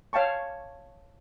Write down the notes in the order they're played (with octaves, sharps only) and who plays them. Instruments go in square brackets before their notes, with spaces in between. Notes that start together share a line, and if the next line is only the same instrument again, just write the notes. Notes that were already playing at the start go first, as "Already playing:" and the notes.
[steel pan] C#5 F5 G5 A5 C#6